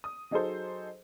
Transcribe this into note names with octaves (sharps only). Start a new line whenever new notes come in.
D#6
F#3 D#4 G#4 A4 C5